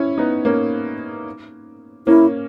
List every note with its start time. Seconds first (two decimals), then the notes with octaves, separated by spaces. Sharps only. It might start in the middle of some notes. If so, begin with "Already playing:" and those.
Already playing: C#4 E4
0.18 B3 D#4
0.45 A#3 C#4
2.07 A#3 C#4 E4